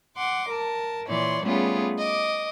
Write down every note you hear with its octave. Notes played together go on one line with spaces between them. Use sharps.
F#5 C6 D6
A#4 A5
A#2 E3 C#5 D5 C6
G3 A3 B3 C#4 F4 G#4
D#5 D6